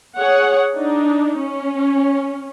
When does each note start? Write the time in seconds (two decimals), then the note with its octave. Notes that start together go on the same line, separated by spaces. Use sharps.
0.17 G#4 C#5 F#5
0.74 D4 D#4
1.39 C#4